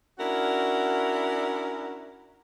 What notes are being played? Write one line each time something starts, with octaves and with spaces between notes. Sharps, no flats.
C#4 D4 E4 F#4 A#4